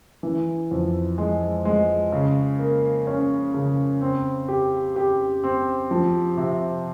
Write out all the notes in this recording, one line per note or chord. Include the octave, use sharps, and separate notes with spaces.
E3
F2
G#3
G#3
C#3
A#3
C#4
C#3
C4
G4
G4
C4
F3
C3